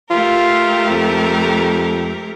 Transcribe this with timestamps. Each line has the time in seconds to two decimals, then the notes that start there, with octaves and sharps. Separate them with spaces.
0.11 A3 F4 G4 A#4
0.90 F2